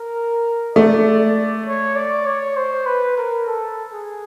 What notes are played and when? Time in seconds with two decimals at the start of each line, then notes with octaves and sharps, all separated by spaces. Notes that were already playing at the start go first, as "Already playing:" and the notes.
Already playing: A#4
0.76 A3 D5
1.66 C#5
1.96 D5
2.26 C#5
2.57 C5
2.86 B4
3.17 A#4
3.47 A4
3.93 G#4